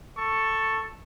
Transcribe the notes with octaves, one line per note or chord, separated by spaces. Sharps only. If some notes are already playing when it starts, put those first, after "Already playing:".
A4 C#6